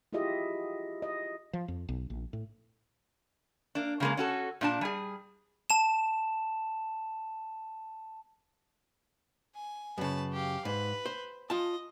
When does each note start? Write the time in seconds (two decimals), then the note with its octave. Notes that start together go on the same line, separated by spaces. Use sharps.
0.13 E4 F4 G4 G#4 D#5 E5
1.02 D#5
1.53 F3
1.68 F2
1.89 B1
2.10 A#1
2.33 A2
3.75 A#3 D4
4.00 C#3 G#3 A#3
4.17 C#4 F#4 A4
4.61 A#2 D4 A5
4.81 G3 G#4
5.70 A5 E7
9.55 G#5
9.98 F#2 C#3 B4 A5
10.33 G4 F5
10.65 G#2 B4
11.06 C5
11.50 F4 D#5 A5